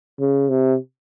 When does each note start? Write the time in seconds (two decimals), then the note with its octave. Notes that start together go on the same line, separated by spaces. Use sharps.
0.20 C#3
0.49 C3